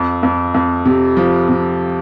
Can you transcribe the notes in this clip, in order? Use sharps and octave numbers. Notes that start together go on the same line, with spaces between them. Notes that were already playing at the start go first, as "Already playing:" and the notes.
Already playing: F2
F2
F2
C3
F3
C3